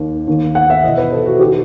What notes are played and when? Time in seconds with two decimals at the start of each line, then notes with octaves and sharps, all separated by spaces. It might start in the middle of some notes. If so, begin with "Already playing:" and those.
Already playing: D#2 D#3
0.27 D#2 D#3
0.55 F#5
0.70 E5
0.84 E2 D#5
0.87 B2
0.97 B4
1.12 A4
1.26 F#4
1.40 G4
1.43 D#3